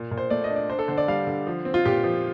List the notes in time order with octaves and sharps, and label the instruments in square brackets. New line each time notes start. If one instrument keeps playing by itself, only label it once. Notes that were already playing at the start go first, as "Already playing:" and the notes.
Already playing: [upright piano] A#2
A#2
C5
A3 D5
D#5
D4
D5
D4 C5
A4
D3 C5
D5
G3 F5
D3
F3
C4
F4
A#2 G4
F3